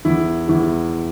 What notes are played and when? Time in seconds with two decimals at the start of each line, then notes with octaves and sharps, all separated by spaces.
0.05 E2 E4
0.48 E2 E4